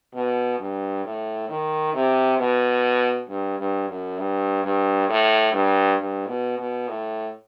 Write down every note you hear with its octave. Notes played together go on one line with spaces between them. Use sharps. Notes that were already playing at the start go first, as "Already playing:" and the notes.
B2
G2
A2
D#3
C3
B2
G2
G2
F#2
G2
G2
A2
G2
G2
B2
B2
A2